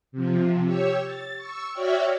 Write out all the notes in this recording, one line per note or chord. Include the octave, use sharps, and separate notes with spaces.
C3 F3
G4 C#5 E6
A6
C#6 E6
F#4 C#5 D5 E5 G5 F6